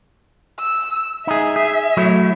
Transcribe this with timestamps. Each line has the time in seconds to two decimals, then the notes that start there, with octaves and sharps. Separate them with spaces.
0.59 E6
1.27 D#4 G#4 E5
1.56 G#4
1.97 F#3 A3 E4